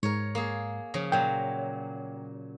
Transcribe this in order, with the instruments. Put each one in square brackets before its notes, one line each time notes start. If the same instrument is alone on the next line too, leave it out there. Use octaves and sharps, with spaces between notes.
[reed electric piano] G#2 [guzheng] A#4 C#5
[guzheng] A#3 G#4
C#3 F3
[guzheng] A#2 F#3 [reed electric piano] G5